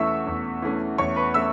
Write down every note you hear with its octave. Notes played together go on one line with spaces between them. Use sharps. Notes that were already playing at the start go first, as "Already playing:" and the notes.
Already playing: E2 E3 A3 C#4 E5 C#6 E6
E2
E3 A3 C#4
E2 C#5 C#6
B4 B5
E3 A3 C#4 E5 E6